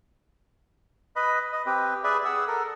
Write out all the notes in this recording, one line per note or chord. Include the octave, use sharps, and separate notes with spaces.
B4 D#5 B5
D#5
C4 G4 B4
G#4 B4 D5 E5
G#4 F#5 E6
A4 A#4